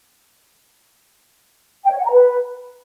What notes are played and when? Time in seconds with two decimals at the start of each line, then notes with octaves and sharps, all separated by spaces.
1.84 G5
1.91 C#5
1.98 F#5
2.05 A#5
2.13 B4